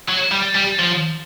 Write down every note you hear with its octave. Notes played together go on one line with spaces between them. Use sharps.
F#3
G3
G3
F3